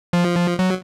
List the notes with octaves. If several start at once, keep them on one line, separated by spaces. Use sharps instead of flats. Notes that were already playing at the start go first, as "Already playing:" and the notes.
F3
F#3